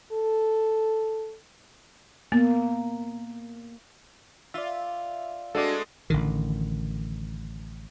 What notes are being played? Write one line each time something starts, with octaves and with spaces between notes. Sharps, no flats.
A4
A#3 B3
F4 D5 E5
G#3 A3 C4 D4 F#4 A4 D5
A1 D3 D#3